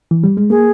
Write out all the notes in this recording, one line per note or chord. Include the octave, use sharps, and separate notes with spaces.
E3
G3
G#3
A#3 G#4